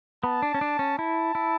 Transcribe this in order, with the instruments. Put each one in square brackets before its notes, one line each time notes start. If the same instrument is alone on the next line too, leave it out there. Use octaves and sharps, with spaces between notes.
[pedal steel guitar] B3 [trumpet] A5
[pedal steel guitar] D4
C#4
D4
C#4
[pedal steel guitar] E4 [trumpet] A5
[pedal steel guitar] E4